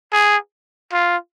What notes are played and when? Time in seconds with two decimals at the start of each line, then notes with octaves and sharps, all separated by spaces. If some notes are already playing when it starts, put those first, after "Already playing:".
0.13 G#4
0.93 F4